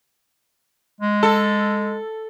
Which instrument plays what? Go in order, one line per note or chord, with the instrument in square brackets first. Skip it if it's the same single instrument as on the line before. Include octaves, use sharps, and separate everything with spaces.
[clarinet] G#3
[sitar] A4